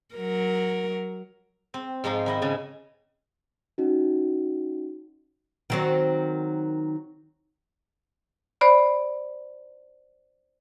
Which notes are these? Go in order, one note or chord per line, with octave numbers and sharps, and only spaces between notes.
F#3 A#4
C4
G#2 F3 G#3 D#4
D#3 E4 D#5
G#2 C#3 G#5
C#4 D#4 F#4
D#3 F#3 C4
C5 D5 B5